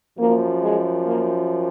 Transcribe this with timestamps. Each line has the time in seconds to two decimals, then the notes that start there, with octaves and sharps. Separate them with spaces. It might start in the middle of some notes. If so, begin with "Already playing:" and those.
0.19 F#2 F3 A#3
0.62 G#3
1.06 A#3